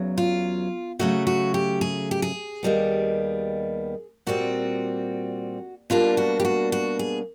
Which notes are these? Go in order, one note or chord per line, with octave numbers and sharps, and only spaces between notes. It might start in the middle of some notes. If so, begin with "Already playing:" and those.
Already playing: E2 C#3 F#3
F4
C#3 F#3 A3 F#4
F#4
G4
G#4
G4
G#4
D#2 D#3 G3 B3
A#2 G3 C4 F#4
B2 G3 A#3 D4 F4
F#4
G4
F#4
F#4
G#4